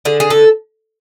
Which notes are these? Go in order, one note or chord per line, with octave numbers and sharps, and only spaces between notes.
D3 G#4
G#4
A4